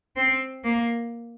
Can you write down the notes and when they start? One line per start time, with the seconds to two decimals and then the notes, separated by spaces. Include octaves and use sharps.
0.16 C4
0.64 A#3